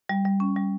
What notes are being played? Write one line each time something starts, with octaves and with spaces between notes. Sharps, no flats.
G3
G3
C#4
G3